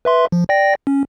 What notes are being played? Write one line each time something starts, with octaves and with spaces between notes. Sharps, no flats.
B4 E5 C6
F3
D5 G5 A#6
C#4